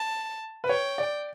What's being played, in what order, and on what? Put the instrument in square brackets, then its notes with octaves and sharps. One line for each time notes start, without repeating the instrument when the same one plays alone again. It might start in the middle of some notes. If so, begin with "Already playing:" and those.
Already playing: [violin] A5
[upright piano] B4
[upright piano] C#5 [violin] G5
[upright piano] D5